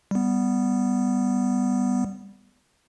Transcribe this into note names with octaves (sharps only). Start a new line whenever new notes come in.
G3 B3